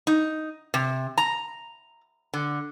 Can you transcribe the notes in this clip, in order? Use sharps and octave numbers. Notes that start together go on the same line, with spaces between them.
D#4
C3
A#5
D3